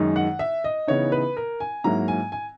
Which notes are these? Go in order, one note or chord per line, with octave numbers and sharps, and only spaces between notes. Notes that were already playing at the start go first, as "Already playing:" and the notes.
Already playing: F#2 D#3 G#3 D#4
F#5
E5
D#5
C#3 E3 B3 D#4 C#5
B4
A#4
G#5
G#2 F#3 A#3 E4 A#5
G#5
G#5